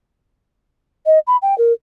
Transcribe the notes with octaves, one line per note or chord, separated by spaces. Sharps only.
D#5
B5
G5
A#4